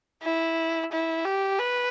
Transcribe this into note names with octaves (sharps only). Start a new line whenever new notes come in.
E4
E4
G4
B4